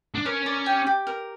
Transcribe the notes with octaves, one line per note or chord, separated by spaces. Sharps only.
D4
C#4 A#4
D5
G4
G4
A#4